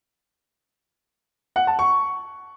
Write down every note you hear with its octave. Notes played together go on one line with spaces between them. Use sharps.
F#5
A5
C#6